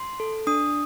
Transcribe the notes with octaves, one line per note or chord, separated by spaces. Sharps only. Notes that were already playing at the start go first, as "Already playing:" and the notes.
Already playing: C6
A4
D4 D#6